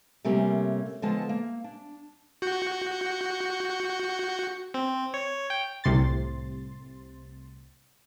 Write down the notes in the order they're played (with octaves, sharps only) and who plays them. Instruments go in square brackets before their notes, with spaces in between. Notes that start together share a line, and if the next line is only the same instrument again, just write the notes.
[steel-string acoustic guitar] C3 G3 A3 A#3 C#4
D3 F3 G#3 B3 A4 A5
A#3
D4
[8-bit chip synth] F#4 G6 C#7
C4
C#5
G5
[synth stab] C2 A2 C3 C6 A6